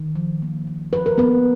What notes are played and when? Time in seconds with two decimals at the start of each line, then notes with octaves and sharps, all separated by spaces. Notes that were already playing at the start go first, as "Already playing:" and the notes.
Already playing: D#3
0.15 F3
0.42 A#3
0.67 F3
0.93 F3 B4
1.06 A#4
1.17 A#3 B3 B4